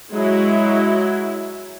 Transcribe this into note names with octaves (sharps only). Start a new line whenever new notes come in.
F#3 G#3 E4